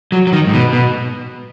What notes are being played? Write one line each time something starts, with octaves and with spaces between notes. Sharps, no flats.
F#3
F#3
D#3
G#2
B2
B2